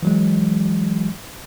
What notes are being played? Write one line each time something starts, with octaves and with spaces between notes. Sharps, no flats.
E3 F#3 G#3